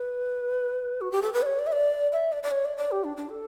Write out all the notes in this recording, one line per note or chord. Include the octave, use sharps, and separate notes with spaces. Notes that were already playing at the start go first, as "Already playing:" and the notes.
Already playing: B4
F#4
G4
A4
B4
D5
C#5
D5
E5
D5
E5
D5
D5
C#5
D5
D5
G4
D4
D4
A4